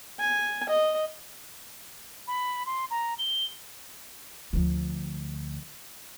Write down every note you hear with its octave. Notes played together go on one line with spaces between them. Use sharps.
G#5
D#5
B5
C6
A#5
G7
D2 F3